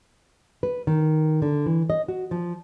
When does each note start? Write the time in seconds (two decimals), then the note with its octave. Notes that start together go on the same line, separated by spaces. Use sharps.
0.63 B4
0.87 D#3
1.42 D3
1.66 E3
1.90 D#5
2.08 F#4
2.31 F3